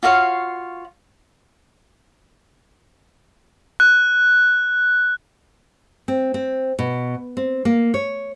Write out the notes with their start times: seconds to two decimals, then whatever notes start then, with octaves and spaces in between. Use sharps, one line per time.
0.03 F4 F#4 C#5 F5
3.80 F#6
6.08 C4
6.34 C4
6.79 B2
7.37 C4
7.65 A#3
7.94 C#5